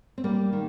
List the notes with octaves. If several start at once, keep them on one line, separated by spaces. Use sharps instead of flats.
C4
G3 A#3
D#3